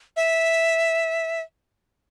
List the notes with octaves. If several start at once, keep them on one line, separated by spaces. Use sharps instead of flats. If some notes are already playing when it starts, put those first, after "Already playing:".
E5